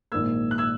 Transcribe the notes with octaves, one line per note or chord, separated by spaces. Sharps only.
A#1 G#2 D#3 A#3 E6 G#6
F#6
E6 G#6